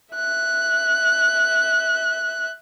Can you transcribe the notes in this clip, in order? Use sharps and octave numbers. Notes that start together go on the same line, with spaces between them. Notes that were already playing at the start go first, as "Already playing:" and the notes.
E5 F#6